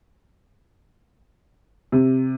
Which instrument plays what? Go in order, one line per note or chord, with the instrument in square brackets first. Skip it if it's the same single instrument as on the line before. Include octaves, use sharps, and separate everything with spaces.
[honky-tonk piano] C3